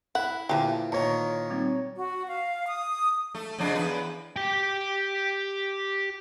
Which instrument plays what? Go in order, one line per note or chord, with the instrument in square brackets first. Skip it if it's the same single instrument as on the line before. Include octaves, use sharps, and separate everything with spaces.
[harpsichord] E4 [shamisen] F#5
[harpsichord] A#2 [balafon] D3 E4 [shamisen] E3 F3 G4
[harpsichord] A#2 D#3 [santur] C#5 A#5
[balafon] G3 C4 D#4
[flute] F#4
F5
D#6
[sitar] A3
F2 C#3 D4
E2 B4
[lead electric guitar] G4 G5